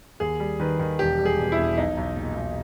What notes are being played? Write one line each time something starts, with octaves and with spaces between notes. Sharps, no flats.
D#2 G#4
G3
D#3 B4
D#3
E1 G4
G3
G#4
B2
E4
E1
B1 D#4
B1
A#2
B1